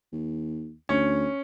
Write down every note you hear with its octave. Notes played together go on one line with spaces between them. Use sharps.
D#2
D2 C#4